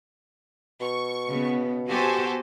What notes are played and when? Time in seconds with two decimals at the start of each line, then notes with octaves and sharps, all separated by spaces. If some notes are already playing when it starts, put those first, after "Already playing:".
0.81 B2 C#6
1.28 C#3 B3
1.88 B3 F#4 G4 A4 C5 G#5